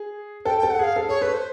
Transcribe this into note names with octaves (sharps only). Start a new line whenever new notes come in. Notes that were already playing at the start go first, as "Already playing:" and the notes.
Already playing: G#4
A4 G5
G5
A4
F#5
G#4 F5
A4
G#4 C#5
A4 B4
C5